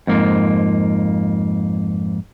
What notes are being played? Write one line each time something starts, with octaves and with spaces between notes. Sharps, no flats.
F2 G#2 A#3